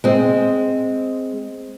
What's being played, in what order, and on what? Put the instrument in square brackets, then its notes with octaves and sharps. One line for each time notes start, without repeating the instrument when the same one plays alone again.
[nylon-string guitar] G#3 C4